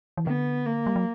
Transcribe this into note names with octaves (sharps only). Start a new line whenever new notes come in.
E3
D3 B3
A#3
G3
F#3